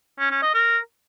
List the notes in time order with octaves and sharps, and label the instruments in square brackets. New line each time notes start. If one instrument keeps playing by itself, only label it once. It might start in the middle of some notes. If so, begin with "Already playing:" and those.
[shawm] C#4
C#4
D#5
A#4